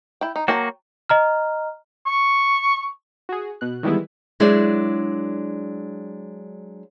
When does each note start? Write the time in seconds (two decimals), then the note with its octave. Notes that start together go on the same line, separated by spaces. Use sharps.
0.21 E4 G5
0.36 D#4
0.48 F#3 A#3 F#4 G5 A5
1.09 D#5 A#5 F6
2.06 C#6
3.29 F#4 G#4
3.61 B2 F#6
3.83 D#3 E3 G3 G#3 B3 E4
4.40 F#3 G#3 D4 E4 C5 D5